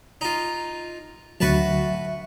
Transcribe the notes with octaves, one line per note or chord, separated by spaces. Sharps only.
D#4 F4
D2 F#3 F#4 B4 E5 A5